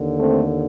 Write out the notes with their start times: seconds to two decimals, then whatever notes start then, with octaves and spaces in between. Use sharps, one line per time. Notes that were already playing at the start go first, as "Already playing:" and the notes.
Already playing: D#2 D3
0.19 A3 C4